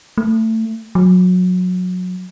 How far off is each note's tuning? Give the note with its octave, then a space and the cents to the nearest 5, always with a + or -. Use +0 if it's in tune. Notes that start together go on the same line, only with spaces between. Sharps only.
A3 +20
F#3 -25